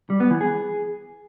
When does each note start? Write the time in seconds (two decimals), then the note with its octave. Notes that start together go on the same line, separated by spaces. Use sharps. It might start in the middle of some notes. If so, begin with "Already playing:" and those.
0.10 G3
0.20 B3
0.30 E3
0.41 G#4